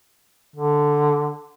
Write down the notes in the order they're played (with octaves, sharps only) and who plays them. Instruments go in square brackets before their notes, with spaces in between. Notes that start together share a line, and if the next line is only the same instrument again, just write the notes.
[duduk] D3